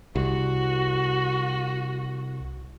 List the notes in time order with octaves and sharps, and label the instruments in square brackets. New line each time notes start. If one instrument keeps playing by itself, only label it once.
[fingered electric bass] C2 [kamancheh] F#4